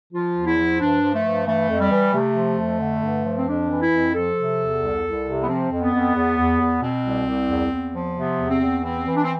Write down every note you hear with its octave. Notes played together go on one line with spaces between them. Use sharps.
F3 F4
E2
E4
F3
G2 D4
F3
A3
G2
E3 A3
F2
G3
E3
C3 A3
F3
F2
D3
G2
F3
C4
F2 D4
E3
E4
F2
F3 A4
C3
E2
C2
C2
C3
B3
F3 C4
F2
B3
F2
E2
E2
E2
B2 C4
C2
C2
E2
E2
F3
C3 B3
E2
C4
E2
E3 C4
E3
D4
C4